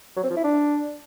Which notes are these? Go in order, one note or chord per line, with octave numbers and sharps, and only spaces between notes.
F#3
C4
F3
E4
D4